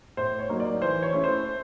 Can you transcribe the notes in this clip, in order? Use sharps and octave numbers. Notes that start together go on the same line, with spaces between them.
A2 C5
C#5
F#3 A#3 D#4
D5
E3 C5
C#5
A3 C#4 E4
C5